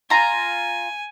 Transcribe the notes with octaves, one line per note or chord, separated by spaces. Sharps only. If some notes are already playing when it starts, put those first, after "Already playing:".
F4 F5 G#5 A#5